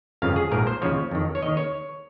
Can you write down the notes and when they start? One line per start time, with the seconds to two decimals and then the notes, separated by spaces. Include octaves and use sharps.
0.22 G1 F2 C#3 F3 F5
0.36 G#4
0.51 A#1 G#2 F3 A#4
0.67 C5
0.82 D#2 C#3 F3 C#5
1.11 F2 D#3
1.35 C#5
1.42 D#2 D#3 D#5
1.57 C#5